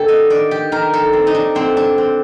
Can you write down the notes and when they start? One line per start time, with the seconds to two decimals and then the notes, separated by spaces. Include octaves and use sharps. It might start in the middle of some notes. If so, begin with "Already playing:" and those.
Already playing: D3 A#3 G4 A4
0.08 D#5
0.30 D#3 D5
0.51 G4
0.72 D#3 A#4
0.93 A4
1.13 C4
1.27 D#4
1.34 D4
1.55 D3 C4
1.77 D4
1.98 C4